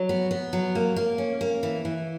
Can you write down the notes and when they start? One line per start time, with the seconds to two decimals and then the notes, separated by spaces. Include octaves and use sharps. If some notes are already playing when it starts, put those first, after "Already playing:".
Already playing: F#3
0.09 B3
0.31 B3
0.53 F#3
0.75 A#3
0.96 A#3
1.18 C#4
1.41 A#3
1.63 E3
1.85 E3